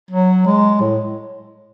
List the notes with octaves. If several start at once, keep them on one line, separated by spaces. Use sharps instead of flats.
F#3
G#3
A2